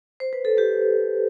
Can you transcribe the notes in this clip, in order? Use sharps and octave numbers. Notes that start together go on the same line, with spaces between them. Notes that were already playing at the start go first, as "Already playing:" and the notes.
C5
B4
A4
G4 B4